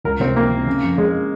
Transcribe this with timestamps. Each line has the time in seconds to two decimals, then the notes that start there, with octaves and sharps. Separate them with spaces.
0.04 C#2 A#4
0.20 C3 C4
0.36 C#2 A#3
0.51 C3
0.66 C#3
0.83 F2
0.98 C#3 G#3